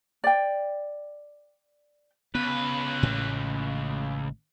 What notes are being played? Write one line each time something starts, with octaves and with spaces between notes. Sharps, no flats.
D5 G5
C#2 B3 B4
A1 A2